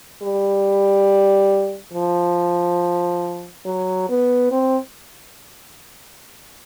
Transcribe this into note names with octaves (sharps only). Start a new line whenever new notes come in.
G3
F3
F#3
B3
C4